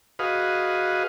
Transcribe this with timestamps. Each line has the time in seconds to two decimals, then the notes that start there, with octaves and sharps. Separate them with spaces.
0.19 F#4 G#4 B4 D#5 F5